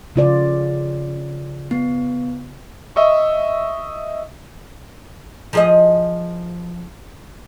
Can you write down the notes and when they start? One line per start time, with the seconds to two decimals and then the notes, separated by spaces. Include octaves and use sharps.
0.16 C#3 F4 D5
1.71 B3
2.96 D#5 E5 C#6
5.53 F3 G#4 D#5